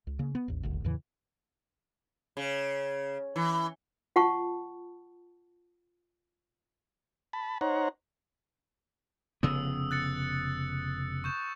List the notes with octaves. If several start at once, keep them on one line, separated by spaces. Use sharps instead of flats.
C#2
C#3 A#3
B3
A1 D#2
D#1 G#1 D2
E2 A2 C#3 E3
C#3
E3
F4 F#5 A5 C#6
A5 B5
D#4 C5 C#5 F#5 A#5
F1 C#3 B3 D#6 E6
F#6 A6 C#7
C#6 G6 E7